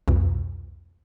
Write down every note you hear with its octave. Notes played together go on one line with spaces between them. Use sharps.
C2 F2 B2